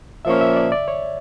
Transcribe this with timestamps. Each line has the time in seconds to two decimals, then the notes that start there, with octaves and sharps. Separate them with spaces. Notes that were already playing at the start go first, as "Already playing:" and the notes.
0.25 A#2 F3 A#3 C#4 E5
0.41 E5
0.56 D5
0.72 D5
0.88 C#5